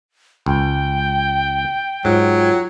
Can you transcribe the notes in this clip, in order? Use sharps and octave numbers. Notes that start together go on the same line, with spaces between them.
C#2 G5
G#2 F#3 F4